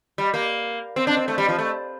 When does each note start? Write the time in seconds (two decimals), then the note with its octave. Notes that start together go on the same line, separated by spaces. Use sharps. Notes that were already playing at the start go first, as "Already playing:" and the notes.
0.18 G3
0.34 A#3
0.96 C4
1.07 D4
1.17 C4
1.28 A3
1.38 G3
1.48 F3
1.59 A3